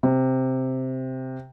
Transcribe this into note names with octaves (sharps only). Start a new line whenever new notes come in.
C3